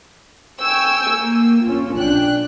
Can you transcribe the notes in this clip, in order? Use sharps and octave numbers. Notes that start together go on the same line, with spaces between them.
G5 G#5 C#6 E6
A#3
C#4 F4
B1 D4 G5 F#6